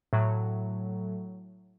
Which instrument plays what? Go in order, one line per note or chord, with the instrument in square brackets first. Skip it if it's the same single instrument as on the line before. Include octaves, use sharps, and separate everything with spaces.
[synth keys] A2 F#3